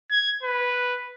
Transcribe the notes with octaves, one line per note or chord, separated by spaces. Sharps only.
G#6
B4